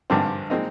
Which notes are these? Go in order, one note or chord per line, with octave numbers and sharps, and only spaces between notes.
G#1 G2 D3 F3 C4
A#2 G#3 C4 D#4